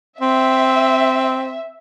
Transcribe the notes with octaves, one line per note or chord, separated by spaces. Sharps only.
C4 E5